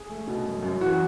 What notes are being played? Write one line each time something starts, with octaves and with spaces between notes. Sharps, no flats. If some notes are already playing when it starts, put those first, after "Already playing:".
Already playing: G#4
A3
B2
F#2
F#2
E3 F#4